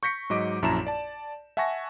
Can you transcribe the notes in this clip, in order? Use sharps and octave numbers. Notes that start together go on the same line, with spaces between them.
C#6 G6 A#6 B6 C#7
G#2 F#3 D#5 D6 D7
A#1 F#2 E4 A5 A#5 E7
D5 A5
E5 F#5 G#5 A5 C#6 A#6